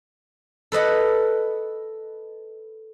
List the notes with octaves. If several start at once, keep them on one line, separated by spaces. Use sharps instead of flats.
A4 B4 D#5 F#5